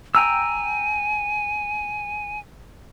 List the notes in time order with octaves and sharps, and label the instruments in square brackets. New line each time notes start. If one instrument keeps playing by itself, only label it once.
[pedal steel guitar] G5 A#5 E6 [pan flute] G#5